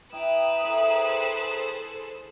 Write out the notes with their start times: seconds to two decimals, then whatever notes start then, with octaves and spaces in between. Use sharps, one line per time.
0.13 E4 B4 G5 A#5 D#6 E7
0.64 E4 G#4 A4 C5